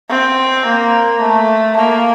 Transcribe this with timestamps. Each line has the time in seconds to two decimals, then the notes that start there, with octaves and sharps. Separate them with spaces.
0.09 C4
0.66 A#3
1.21 A3
1.77 A#3